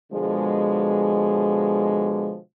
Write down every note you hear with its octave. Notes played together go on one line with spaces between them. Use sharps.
B2 D3 F3 G#3